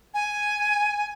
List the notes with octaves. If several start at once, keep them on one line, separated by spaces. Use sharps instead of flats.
G#5